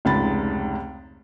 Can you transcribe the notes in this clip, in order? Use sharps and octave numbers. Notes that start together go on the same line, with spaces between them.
F1 C#2 G#2 B5 A6